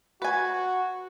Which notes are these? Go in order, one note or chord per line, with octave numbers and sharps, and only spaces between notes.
F#4 B4 G#5